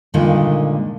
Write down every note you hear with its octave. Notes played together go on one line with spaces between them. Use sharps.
G2 A#2 D3 D#3 G#3